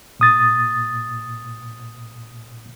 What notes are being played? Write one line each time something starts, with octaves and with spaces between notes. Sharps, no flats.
A#2 D#6 A6